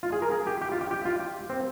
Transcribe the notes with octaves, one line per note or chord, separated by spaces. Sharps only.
F4
G#4
A#4
G#4
G4
G4
F4
G4
G4
F4
G4
C4